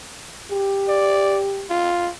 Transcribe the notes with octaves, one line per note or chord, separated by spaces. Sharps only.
G4
D5
F4